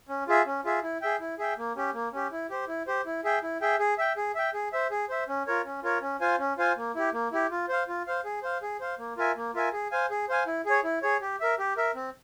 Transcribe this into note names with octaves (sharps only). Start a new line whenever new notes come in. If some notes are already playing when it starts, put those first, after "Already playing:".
C#4
F4 G#4 E5
C#4
F4 G#4 E5
E4
G#4 E5 G5
E4
G#4 E5 G5
A#3
C#4 G4
A#3
C#4 G4
E4
G4 C5
E4
G4 C5
E4
G#4 E5 G5
E4
G#4 E5 G5
G#4
E5 G5
G#4
E5 G5
G#4
C5 E5
G#4
C5 E5
C#4
F4 A#4 C#5
C#4
F4 A#4 C#5
C#4
F4 C5 F5 G#5
C#4
F4 C5 F5 G#5
A#3
E4 G4
A#3
E4 G4
F4
C5 F5
F4
C5 F5
G#4
C5 F5
G#4
C5 F5
A#3
F4 A#4 E5 G#5
A#3
F4 A#4 E5 G#5
G#4
C5 F5 G#5
G#4
C5 F5 G#5
E4
G#4 C#5
E4
G#4 C#5
G4
A#4 E5
G4
A#4 E5
C4